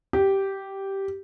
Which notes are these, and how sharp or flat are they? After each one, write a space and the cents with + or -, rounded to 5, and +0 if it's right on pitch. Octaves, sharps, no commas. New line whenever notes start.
G4 -10